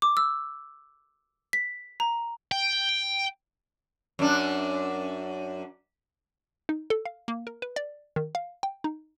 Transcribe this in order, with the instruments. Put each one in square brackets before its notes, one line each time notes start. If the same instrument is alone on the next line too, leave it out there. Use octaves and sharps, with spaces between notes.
[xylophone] D6
E6
B6
A#5
[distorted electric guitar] G5
[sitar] F#2 D4
[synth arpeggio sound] D#4
A4
F5
A#3
A#4
B4
D5
D#3
F5
G5
D#4